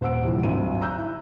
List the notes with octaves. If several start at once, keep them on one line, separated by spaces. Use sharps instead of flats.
D#1 C5 F#5 E6 D7
C3 E3 F3 G3
G#1 D2 F#3 C4 D#7
A#5 E6 F#6 G6
E4